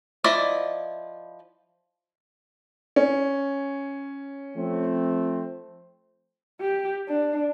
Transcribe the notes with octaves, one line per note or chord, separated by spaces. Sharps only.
F3 E4 D5 D#5
C#4
F3 A3 C4
G4
D4